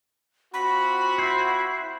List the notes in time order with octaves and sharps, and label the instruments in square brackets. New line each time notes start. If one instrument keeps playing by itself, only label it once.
[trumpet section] C4 F4 F#4 [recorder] B5
[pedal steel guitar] E4 C5